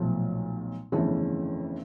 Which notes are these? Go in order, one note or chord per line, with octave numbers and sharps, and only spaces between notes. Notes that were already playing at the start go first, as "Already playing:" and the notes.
Already playing: B1 A#2 F3 A3
G1 F2 C#3 E3 A3